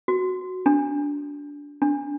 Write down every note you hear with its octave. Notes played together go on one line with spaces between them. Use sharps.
F#4
D4
D4